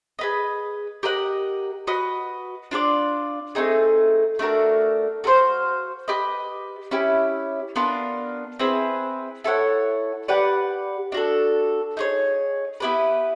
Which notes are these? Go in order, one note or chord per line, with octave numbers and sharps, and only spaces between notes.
G#4 B4 D#5
G4 A#4 D#5 F#5
F#4 B4 D#5
D4 F4 A#4 D5
A3 C4 D#4 G#4
A3 D4 F#4 A#4
F#4 A4 C5 F5
G4 B4 D#5
C#4 E4 G4
B3 D4 F4 A#4
C4 E4 G#4 B4
E4 A4 C#5 F#5
G4 B4 D5 F#5
D4 F#4 A4
D#4 G#4 C#5
B3 E4 G4 B4